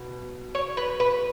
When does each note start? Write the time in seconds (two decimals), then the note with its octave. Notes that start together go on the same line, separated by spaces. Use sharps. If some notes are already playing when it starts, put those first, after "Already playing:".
Already playing: B2
0.55 C#5
0.77 B4
1.00 B4